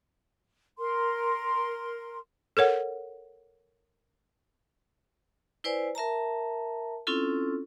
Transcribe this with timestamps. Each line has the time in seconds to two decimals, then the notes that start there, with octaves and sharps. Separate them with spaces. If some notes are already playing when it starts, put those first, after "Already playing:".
0.78 A#4 C6
2.57 A4 A#4 C#5 F#5
5.64 E4 B4 C5 D5 G#5
5.95 A#4 E5 A5 A#5
7.07 C4 C#4 E4 F4 A4